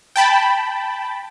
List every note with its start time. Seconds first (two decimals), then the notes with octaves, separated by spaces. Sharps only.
0.16 G5 A5 B5